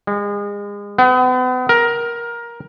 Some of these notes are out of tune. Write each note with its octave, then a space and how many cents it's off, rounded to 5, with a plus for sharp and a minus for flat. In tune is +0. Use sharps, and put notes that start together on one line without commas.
G#3 -35
B3 +40
A#4 +15